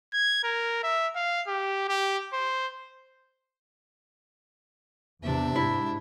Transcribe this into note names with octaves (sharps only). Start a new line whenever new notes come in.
G#6
A#4
E5
F5
G4
G4
C5
E2 C3 D4 E5
G#2 E4